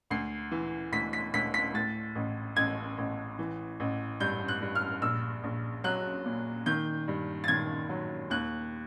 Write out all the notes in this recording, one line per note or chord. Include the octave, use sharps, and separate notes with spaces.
D2 C7
E3
D2 B6
B6
D2 B6
B6
A2 A6
A1
A1 G#6
A1
E3
A1
G2 G6
F#6
G2
F6
A#1 E6
A#1
F#3 F#6
A#2
D#3 G6
G2
A6
D#3 G#6
F#3
D#2 F#6